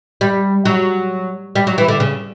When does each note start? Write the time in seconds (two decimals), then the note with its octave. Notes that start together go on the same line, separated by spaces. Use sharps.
0.21 G3
0.65 F#3
1.56 G3
1.67 F#3
1.78 E3
1.88 D3
2.00 C#3